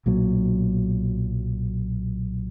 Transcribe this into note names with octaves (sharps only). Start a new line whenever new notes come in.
B1 A#2 F#3